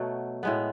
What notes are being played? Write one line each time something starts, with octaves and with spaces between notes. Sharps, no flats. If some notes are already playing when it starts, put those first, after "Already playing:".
Already playing: B2 F#3 A3
A2 G#3 B3